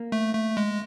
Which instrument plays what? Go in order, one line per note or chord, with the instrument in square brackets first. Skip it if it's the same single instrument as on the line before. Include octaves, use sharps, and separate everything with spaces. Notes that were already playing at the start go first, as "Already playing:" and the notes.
Already playing: [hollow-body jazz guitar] A#3
[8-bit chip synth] A3
A3
G#3